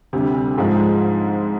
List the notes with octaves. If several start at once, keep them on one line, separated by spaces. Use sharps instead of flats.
D2 C3 G3
G#2 F3 G#3